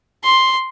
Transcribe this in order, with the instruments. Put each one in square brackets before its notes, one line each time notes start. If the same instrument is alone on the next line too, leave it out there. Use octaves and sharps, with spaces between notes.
[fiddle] C6